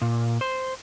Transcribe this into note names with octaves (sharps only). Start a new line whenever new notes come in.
A#2
C5